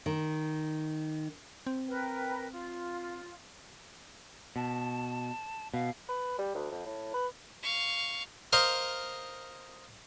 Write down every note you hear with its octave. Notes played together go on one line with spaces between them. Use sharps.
D#3
C4
A#4 B4 G5
F4
B2 A5
B2 F5
B4
G3
D2
F2
A2
B4
F5 C#6
A#4 C5 D#5 F5